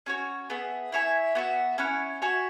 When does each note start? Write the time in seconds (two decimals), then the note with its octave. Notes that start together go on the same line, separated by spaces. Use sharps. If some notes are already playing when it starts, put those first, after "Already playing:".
0.06 C#4 F#4 C#5
0.50 B3 G#4 E5
0.92 E4 C#5 E5 G#5
1.35 B3 F#4 E5
1.78 C#4 E4 C#5 F#5
2.22 F#4 C#5 E5 G#5